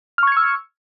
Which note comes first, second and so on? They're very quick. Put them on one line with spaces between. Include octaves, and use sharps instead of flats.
F6 C#6 G#6 C#7 E6